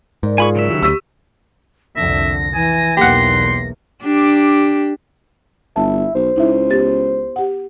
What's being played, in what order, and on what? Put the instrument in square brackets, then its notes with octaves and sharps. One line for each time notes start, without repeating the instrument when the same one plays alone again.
[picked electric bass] G#2 [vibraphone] A#4 D5
[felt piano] F4 G#4 [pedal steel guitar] G#5 B5 C#6
[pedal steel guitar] C#3 F#3 E5
[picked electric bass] D#3 E3 [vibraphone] G4
[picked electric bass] D2 [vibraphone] G4 C#6 [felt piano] E6 B6 D#7
[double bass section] C2 F2 D3 [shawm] E5 [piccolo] A#6
[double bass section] E3 [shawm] G#5
[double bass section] B1 E2 A#3 [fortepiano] G4 F#5 [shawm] C6
[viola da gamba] D4 G4
[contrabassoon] G1 [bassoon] E4 [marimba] A5
[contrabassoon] B1 [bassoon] C5
[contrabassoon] C#2 [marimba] D#4 E4 E5
[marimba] B3 G4 A6
G4 F#5